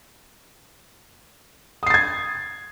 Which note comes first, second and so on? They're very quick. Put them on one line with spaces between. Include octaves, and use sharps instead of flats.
D#6 C7 A6 G#6